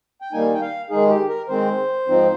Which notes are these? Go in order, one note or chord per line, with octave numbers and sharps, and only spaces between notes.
G5
D#3 G3 A#3 D#4 G#5
G5
F5
D#3 G#3 D#4 G#4
G4
A#4
D#3 G#3 C4 C5
G#2 F3 C4 D#4